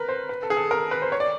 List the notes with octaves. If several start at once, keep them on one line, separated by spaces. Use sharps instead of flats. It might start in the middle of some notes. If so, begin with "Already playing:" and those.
Already playing: A#4 B4
C5
B4
A4
G#4
A4
A#4
B4
C5
C#5
D5